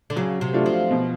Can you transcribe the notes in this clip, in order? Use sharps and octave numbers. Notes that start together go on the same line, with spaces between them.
D3
C#3 F#3
C3
A3 D4 F4
F3
B2